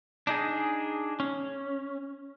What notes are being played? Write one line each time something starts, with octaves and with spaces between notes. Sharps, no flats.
D4 D#4 G#4
C#4